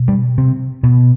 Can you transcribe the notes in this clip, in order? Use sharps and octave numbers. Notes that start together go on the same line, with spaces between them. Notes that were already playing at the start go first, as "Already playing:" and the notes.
Already playing: B2
G2 G3
C3 C4
B2 B3